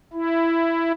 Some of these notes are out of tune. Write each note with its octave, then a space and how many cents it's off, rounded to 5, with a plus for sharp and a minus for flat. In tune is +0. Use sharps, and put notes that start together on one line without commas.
E4 +10